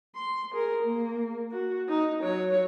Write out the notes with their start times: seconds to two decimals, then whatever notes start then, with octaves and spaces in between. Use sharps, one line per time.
0.15 C6
0.53 G#4 A#4
0.83 A#3
1.51 F#4
1.88 D#4
2.23 F#3 C#5